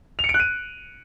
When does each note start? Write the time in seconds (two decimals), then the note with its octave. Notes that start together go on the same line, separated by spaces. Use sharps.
0.19 F7
0.24 C#7
0.29 D7
0.34 F#6
0.40 D#7